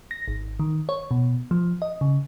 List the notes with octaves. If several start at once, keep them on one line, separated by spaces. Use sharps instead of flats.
A#6
G#1
D#3
C#5
B2
F3
D#5
C#3